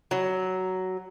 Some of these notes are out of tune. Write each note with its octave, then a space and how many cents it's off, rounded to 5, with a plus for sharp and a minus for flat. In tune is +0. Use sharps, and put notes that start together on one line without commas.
F#3 +10